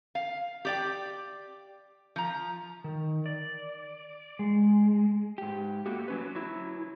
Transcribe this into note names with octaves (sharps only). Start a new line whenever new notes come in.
F5
G4 D5 G5
F3 A#5
D#3
D5
G#3
G#2 G4
A3 A#3 F#4 G4
F#3 C#4 B4
F#3 E4